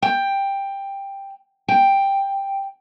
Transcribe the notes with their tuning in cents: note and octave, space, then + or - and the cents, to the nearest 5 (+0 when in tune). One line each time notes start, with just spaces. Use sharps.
G5 +10
G5 +5